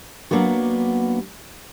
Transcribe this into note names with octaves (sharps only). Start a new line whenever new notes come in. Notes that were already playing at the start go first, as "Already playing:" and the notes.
F#3 G#3 A#3 B3 D4 F#4